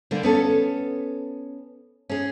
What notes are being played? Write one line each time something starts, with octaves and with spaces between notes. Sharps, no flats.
D3 G3 A#3 D4
B3 C#4 A4
C#4 G#4